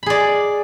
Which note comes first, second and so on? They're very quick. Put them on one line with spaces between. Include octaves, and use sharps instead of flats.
B5 G#4 D5